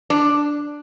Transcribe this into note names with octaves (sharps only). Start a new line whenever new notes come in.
D4